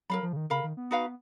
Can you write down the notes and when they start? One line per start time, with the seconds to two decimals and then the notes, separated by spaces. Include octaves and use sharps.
0.10 F#3 A#4 F5 B5
0.23 F3
0.33 C#3
0.36 D#3
0.50 C#3 A#4 F5 B5
0.63 D#3
0.77 B3
0.91 D#4 F#4 B4 F5